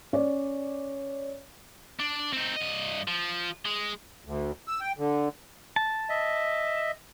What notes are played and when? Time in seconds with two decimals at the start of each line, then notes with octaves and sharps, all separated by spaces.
0.13 C#4 C#5 D5
2.00 D4
2.33 C4 D#4
2.56 G2 D#5
3.08 F3
3.65 G#3
4.25 D2
4.68 E6
4.81 G5
4.98 D3
5.76 A5
6.09 D#5 E5